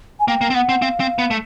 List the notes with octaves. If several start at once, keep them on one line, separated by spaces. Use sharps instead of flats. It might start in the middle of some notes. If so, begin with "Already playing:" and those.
G#5
A#3 G5
A#3
C4
B3 F#5
C4
C4 F5
C4
B3
A3